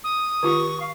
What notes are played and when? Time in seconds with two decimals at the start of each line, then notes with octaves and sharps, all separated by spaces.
0.04 D#6
0.43 D#3 F4 G4 C#6
0.80 F5